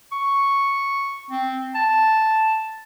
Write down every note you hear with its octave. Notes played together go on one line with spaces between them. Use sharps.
C#6
C4
A5